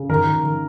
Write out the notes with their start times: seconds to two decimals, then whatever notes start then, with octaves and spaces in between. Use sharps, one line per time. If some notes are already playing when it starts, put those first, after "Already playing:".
Already playing: C#3
0.09 D#3 A#4
0.27 D#3
0.44 D#3